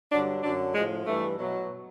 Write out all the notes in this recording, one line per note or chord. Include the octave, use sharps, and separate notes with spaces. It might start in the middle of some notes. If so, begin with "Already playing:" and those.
G2 D3 F#3 D4
F#2 D3 F#3 D4
A2 F3 G#3
G2 E3 A3
B2 F#3